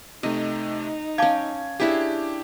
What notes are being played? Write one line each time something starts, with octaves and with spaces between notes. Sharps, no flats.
C3 A3 D#4 D#5
C#4 F5 G5 A5 D6 G#6
C#4 D4 E4 G4 G#4